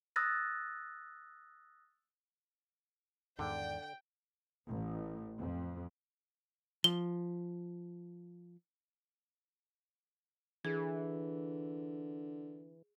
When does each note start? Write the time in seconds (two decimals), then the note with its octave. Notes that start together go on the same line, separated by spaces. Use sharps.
0.16 D#6 E6 F#6 A6 A#6
3.39 E2 G#2 D3 D#3 D5 G5
4.67 A1
5.39 F2
6.84 F3 G7
10.65 D3 E3 G#4